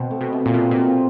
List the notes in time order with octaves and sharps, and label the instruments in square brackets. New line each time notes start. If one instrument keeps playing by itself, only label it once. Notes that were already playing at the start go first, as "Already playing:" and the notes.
Already playing: [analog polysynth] B2 [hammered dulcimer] C4
[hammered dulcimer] A3
[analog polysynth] B2
[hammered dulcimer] C3
[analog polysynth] A#2
[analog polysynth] B2 [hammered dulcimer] F3
[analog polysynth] A#2 [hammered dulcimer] C4